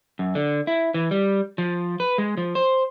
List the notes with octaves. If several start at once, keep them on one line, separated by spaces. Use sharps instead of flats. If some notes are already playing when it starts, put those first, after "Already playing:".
F#2
D3
E4
E3
G3
F3
B4
G#3
F3
C5